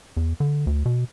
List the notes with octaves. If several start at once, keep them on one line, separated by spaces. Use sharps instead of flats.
E2
D3
D2
B2